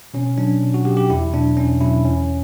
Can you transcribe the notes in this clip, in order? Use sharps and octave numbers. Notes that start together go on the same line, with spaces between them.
B2 C#4
F#3 D4
B2
F#4
F#3 G4
G4
E2 E4
B2 F#3 D4
E2 C#4
B2 F#3 E4
E2 C#4